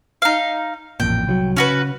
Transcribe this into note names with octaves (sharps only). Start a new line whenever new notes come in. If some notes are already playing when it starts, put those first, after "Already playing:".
D#4 F5
A1 F2 A#2 G5
C2 F3 F#3
C#3 C#4 F#4 B4